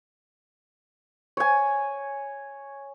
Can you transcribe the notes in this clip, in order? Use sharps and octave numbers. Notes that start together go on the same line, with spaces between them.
C#5 G#5